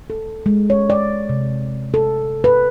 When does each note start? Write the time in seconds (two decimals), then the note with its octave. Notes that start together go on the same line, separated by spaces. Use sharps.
0.10 A4
0.46 G#3
0.70 C#5
0.90 D5
1.29 C3
1.94 A4
2.44 B4